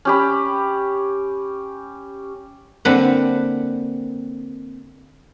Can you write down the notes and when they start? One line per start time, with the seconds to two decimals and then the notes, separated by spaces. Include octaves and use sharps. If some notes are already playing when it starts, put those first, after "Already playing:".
0.05 C#4 G4 B5
2.85 D3 A#3 C4 B4